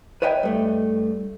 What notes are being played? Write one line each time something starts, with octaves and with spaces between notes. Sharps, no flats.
B4 C#5 D#5 E5 G5
G2 A3